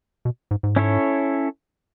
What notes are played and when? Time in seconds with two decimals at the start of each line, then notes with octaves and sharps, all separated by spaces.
0.25 B2
0.51 G#2
0.63 G#2
0.76 C#4 E4 A4 C#5